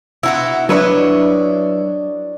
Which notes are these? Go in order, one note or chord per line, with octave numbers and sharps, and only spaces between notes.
B2 D#4 E4 F#4 F#5
F#3 D4 E4 B4 C#5 D#5